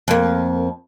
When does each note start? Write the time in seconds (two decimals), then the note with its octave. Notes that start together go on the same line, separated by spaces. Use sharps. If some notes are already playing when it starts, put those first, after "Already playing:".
0.08 F2 A#3